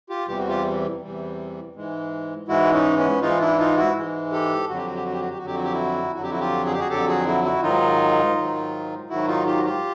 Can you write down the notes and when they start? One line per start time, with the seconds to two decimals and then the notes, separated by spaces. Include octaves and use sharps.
0.10 F4 G4
0.28 E2 C3 E3 G3 G4
0.38 F#4
0.48 F4 G4
1.02 E2 C3 E3 G3
1.75 G#2 E3 G#3
2.48 G#2 E3 G#3 E4 F#4
2.73 C#4 D#4
2.97 B3 C#4
3.21 G#2 E3 G#3 D#4 F4
3.40 D4 E4
3.58 D#4 F4
3.76 E4 F#4
3.96 G#2 E3 G#3
4.32 G4 A4
4.70 F2 D3 F#3 F#4
4.77 G4
4.86 F#4
4.95 G4
5.04 F#4
5.12 G4
5.21 F#4
5.29 G4
5.37 F#4
5.42 F2 D3 F#3 G4
5.55 F#4
5.64 G4
5.72 E4 F#4
6.15 F2 D3 F#3 F#4
6.23 G4
6.30 E4 F#4
6.40 F4 G4
6.65 G#4
6.73 G4
6.79 F#4 G#4
6.89 F2 D3 F#3 G4 A4
7.08 F#4 G#4
7.26 E4 F#4
7.44 E4 F#4
7.62 G#2 D#3 F#3 D#4 F4
8.37 G#2 D#3 F#3
9.10 G#2 D#3 F#3 E4 F#4
9.28 D#4 F4
9.46 F4 G4
9.56 F#4
9.64 F4 G4